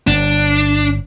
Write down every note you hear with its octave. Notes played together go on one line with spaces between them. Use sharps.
G1 D4